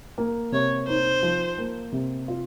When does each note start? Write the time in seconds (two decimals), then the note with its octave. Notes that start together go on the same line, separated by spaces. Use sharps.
0.18 A#3
0.52 C3 C#5
0.88 D#4 C5
1.23 F3
1.58 A#3
1.92 C3
2.28 F4